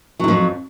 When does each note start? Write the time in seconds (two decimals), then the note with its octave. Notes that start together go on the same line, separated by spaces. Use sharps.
0.20 F#3
0.24 G#2
0.28 F2